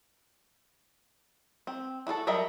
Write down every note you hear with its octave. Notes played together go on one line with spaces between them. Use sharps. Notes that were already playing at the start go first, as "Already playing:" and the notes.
C4
E4 F#4 G#4 A4
F#3 G3 A#4 D#5 E5